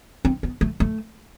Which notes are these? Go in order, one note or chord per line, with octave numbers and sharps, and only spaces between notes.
C4
B3
A3
A3